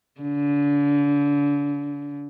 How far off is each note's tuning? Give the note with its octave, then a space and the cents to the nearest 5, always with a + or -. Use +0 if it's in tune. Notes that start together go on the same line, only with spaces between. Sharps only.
D3 -35